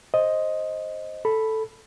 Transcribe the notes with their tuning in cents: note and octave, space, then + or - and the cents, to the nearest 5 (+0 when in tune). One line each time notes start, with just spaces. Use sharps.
C5 +10 D#5 +5
A4 +0 B5 +0